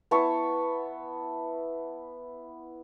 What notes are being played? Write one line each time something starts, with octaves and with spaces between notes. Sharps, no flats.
B3 E4 A5 C#6